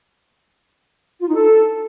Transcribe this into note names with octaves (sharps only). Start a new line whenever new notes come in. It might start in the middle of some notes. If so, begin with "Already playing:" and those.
F4
D#4
A4